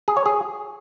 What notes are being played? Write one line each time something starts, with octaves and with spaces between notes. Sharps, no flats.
G#4
C#5
G#4